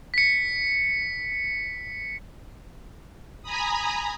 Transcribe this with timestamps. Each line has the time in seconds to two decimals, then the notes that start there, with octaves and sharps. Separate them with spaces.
0.14 B6 C#7
3.43 G#5 A#5 B5 D#6